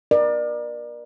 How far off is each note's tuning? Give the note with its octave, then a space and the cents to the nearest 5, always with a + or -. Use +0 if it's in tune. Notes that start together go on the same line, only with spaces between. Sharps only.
A#4 +35 D5 +30